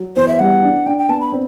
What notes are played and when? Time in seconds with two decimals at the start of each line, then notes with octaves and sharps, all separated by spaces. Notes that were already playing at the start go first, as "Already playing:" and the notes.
Already playing: F#3
0.16 E2 C5
0.28 E5
0.39 G3 F#5
0.62 D4
0.86 D4 G5
0.98 G5
1.09 B3 A5
1.20 B5
1.32 C4